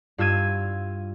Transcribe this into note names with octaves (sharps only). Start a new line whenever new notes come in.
G2 F4 E6 G#6 D#7